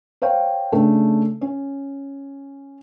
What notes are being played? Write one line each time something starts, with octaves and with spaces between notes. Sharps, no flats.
C5 C#5 F5 G5
C#3 A3 D4
C#4